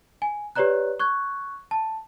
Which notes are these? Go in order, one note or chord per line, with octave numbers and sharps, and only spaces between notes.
G#5
G4 B4 C#5 D5 A#5 F#6
C#6 F#6 G#6
A5